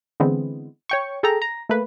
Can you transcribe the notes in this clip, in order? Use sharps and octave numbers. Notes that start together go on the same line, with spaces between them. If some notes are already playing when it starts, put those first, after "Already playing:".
D3 E3 G#3 B3 C4
C#5 G5 C#6
G#4 A4 G5 A#5
A#5
A3 A#3 B4